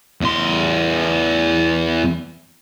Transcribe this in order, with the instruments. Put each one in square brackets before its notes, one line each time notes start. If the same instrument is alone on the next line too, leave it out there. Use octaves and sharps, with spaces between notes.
[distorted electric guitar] E2 C6